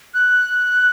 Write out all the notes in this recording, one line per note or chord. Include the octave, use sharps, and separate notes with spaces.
F#6